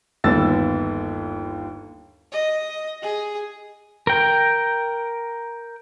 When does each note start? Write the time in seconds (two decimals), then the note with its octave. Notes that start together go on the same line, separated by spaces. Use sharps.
0.24 G1 D#2 B3 E6 A6
2.32 D#5
3.02 G#4
4.07 A#4 G5